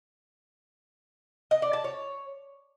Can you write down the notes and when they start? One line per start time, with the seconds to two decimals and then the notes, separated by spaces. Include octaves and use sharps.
1.51 D#5
1.62 D5
1.73 A5
1.84 C#5